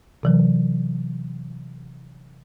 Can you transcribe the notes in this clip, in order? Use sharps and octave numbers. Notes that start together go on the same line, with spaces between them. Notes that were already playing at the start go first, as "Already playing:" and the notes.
C3 E3 F#3